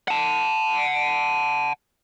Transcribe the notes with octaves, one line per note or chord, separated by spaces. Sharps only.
F#5 A5